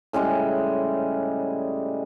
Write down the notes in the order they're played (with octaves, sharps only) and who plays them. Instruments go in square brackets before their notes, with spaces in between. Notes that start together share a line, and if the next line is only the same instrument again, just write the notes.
[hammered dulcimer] A2 C#3 G3 G#3